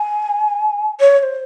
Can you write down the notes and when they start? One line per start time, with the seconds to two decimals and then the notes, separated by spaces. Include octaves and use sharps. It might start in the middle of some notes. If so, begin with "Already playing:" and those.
Already playing: G#5
1.00 C#5
1.19 C#5
1.23 C5